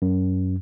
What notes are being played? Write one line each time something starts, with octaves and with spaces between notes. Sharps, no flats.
F#2